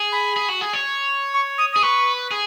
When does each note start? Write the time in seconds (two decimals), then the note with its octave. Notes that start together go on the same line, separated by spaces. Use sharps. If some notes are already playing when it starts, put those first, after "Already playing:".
Already playing: G#4
0.12 B5
0.36 G#4
0.49 F#4
0.61 G#4
0.73 C#5
1.34 C#6
1.58 D#6
1.73 G#4 D#6
1.83 B4 C#6
2.31 G#4